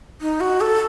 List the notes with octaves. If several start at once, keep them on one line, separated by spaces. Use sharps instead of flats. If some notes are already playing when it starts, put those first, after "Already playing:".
D#4
F#4
A4